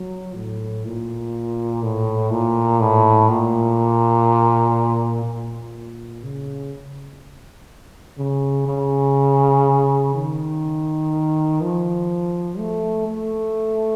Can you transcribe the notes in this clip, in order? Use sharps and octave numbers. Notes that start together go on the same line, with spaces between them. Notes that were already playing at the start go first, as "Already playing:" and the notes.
Already playing: F#3
A2
A#2
A2
A#2
A2
A#2
A#2
C#3
C#3
C#3
D#3
F3
A3
A3